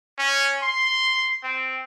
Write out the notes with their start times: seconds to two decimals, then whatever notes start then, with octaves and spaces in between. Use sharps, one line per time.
0.18 C#4
0.63 C6
1.43 C4